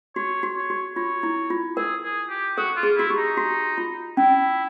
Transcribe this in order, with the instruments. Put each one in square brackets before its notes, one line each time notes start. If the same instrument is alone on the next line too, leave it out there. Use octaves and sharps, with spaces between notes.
[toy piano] F#4 [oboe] C#5
[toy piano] F#4
[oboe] C#5
[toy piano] F#4
[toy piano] F4 [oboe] C#5
[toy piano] E4
F4
[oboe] G#4 [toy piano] A#4
[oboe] G#4
G4
[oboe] F#4 [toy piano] A4
[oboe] F4
[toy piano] G#4
[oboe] E4 [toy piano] F#4
[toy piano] G4
[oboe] D#4
[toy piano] F#4
F4
[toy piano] C#4 [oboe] E4